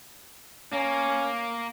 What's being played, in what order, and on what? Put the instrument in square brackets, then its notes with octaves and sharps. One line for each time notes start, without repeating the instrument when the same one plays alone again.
[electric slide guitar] A#3 [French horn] C#4